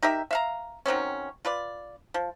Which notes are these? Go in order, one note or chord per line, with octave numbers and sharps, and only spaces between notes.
D#4 G4 A#4 E5
E5 F5 A#5
D#3 F#3 C4 C#4
F4 B4 D5
F3